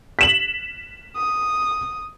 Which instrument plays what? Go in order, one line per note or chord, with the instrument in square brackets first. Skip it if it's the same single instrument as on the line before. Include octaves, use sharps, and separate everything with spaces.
[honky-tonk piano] B6 E7 F#7
[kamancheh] D#6